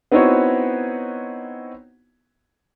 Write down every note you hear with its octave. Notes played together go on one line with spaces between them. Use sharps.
B3 C4 D#4 E4 F#4 C#5